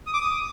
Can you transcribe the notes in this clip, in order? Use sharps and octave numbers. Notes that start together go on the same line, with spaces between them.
D#6
D6
D#6